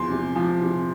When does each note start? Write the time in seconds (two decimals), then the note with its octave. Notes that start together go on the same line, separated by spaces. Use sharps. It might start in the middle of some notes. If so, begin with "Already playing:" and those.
Already playing: E2 F3 C6
0.10 C3
0.36 F3
0.62 C3